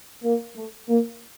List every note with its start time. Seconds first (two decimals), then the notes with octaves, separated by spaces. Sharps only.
0.24 A#3
0.56 A3
0.89 A#3